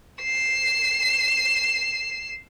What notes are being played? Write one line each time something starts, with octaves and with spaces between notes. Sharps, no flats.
C7 E7